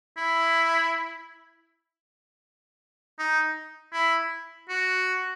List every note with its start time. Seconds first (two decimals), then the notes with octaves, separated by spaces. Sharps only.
0.17 E4
3.18 D#4
3.93 E4
4.69 F#4